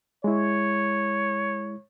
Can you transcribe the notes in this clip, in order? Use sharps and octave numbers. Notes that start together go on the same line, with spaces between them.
G#3 E4 C#5